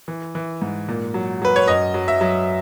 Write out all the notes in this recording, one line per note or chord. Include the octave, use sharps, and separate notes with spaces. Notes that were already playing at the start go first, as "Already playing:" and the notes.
E3
E3
G#2
A#2
F#3
F#3 B4
C#5
F#2 D#5
F#3
E5
F#3